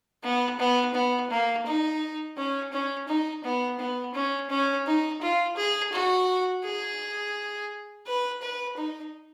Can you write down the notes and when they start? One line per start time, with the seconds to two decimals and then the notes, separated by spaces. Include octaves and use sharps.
0.23 B3
0.59 B3
0.94 B3
1.30 A#3
1.65 D#4
2.37 C#4
2.72 C#4
3.08 D#4
3.44 B3
3.79 B3
4.14 C#4
4.50 C#4
4.86 D#4
5.21 F4
5.57 G#4
5.93 F#4
6.64 G#4
8.06 B4
8.42 B4
8.77 D#4